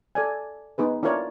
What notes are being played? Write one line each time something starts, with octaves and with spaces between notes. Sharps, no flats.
A4 D5 G#5
B3 D#4 G#4 B4
D4 E4 F4 A#4 C#5 D5